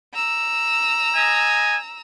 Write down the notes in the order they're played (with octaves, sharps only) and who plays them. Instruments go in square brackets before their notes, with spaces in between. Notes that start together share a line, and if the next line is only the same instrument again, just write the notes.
[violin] A#5 E6
[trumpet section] D#5 G#5